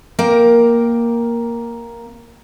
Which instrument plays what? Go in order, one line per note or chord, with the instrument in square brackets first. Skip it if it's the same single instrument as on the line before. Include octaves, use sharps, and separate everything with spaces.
[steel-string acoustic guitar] A#3 A#4 G5